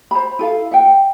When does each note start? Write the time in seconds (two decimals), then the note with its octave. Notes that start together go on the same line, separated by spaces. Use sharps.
0.11 C5 A#5 B5
0.39 E4 A4 F5
0.71 E5 F#5 G5